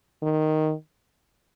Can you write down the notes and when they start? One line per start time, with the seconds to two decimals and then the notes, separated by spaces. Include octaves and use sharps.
0.23 D#3